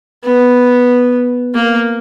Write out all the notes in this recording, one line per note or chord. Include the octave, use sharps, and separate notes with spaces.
B3
A#3